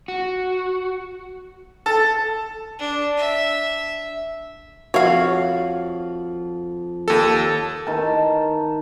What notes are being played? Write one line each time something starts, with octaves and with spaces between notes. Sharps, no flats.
F#4
A4
D4
E5
F2 F3 F#4 C#5 F5
D#2 A4
D#3 A5